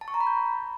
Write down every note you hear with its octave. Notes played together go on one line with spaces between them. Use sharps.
A5
C#6
A#5
B5
G6